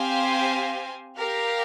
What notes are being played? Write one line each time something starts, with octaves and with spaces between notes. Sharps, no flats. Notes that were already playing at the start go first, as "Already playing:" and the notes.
Already playing: C4 G4 C5 F5 G#5
G4 A#4 F5